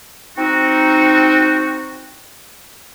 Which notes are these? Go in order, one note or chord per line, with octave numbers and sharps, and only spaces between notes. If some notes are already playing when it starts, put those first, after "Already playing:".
C4 D#4 F#4